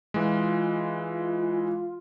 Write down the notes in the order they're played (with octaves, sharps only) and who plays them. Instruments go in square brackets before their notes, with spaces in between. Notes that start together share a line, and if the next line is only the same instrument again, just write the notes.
[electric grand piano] E3 G#3 [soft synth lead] F4